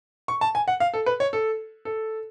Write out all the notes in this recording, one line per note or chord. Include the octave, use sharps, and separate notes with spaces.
C#6
A5
G#5
F#5
F5
A4
B4
C#5
A4
A4